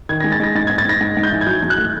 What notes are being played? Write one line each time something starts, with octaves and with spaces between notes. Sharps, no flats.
D#3 G#6
A#6
G#3
A6
G#3 A#6
G#2 A6
G#6
G#2
A6
G#2 A#6
G#2
G#2
G6
E3
G#6
F#3 G6
E2
F#6
A3